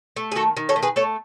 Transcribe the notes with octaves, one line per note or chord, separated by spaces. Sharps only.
A3
G#4
D#3 F#4 A4
D#3
A4 C#5
A3
G#4 B4
A3 A4 C#5